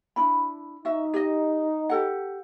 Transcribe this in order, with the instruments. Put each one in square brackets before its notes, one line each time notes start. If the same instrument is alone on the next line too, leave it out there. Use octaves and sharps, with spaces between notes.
[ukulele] D4 E4 B5
[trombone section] D#4 [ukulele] F#4 E5
[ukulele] G4 D#5
G4 A4 F#5